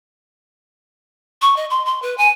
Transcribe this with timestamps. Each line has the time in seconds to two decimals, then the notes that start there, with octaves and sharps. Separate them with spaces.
1.42 C#6
1.56 D#5
1.70 C6
1.86 C6
2.02 B4
2.18 G#5